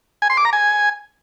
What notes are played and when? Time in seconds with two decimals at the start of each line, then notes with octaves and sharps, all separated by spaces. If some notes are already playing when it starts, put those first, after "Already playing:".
0.22 G#5
0.30 C6
0.37 D6
0.45 A#5
0.53 G#5